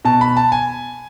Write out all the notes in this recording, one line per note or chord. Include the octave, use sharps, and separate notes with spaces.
B2 A5
B5
A5
G#5